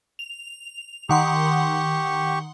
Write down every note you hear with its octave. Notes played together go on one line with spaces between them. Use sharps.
F7
D#3 G4 F#5 C6 C#6